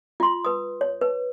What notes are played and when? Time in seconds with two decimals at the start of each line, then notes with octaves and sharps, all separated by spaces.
0.20 F4 C6
0.45 B4 D#6
0.81 C#5
1.01 B4